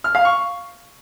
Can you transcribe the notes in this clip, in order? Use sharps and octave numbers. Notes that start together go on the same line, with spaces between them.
F6
F5
C#6